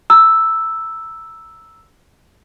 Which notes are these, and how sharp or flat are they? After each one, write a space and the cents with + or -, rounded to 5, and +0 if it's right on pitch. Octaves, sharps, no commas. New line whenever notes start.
A#5 +0 E6 +0